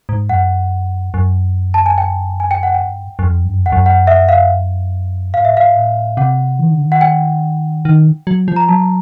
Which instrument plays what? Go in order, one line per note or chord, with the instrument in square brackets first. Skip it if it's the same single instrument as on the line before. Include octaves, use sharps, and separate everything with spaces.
[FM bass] G#2
[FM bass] F#2 [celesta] F#5
[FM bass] F#2
[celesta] A5
G#5
G5
G#5
G5
F#5
G5
[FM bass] G2
F#2
F2
G2
F#2
[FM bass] F2 [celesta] F#5
[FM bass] F#2
[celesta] F#5
E5
F5
[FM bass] G#2 [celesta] F5
[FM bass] A2 [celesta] E5
[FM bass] G#2 [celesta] F5
[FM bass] A2
[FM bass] C3 [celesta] F#5
[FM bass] E3
D#3
D3
D#3
[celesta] F#5
G5
[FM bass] D#3
F#3
F3
[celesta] A#5
[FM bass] F#3 [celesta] A5